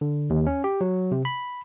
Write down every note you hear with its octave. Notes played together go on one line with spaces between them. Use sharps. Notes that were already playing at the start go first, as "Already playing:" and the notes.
D3
D#2
C#4
G4
F#3
C3
B5